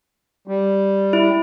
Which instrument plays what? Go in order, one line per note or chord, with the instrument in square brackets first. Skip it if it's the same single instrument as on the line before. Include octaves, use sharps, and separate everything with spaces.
[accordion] G3
[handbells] E4